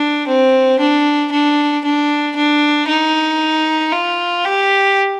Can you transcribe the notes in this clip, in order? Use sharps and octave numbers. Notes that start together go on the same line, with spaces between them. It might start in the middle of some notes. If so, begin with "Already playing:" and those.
Already playing: D4
C4
D4
D4
D4
D4
D#4
F4
G4